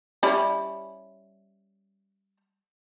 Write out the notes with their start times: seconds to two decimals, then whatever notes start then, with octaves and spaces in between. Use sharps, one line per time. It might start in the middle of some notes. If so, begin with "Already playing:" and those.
0.23 G3 C#4 E4